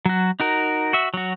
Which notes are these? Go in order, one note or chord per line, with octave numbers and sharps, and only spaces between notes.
F#3 F#4
D#4 F#4 A#4
F#4 E5
F#3 F#4